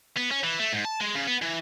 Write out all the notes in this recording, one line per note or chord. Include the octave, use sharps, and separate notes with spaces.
B3
C#4
E3
A3
G#2
A5
G#3
C#3
B3
E3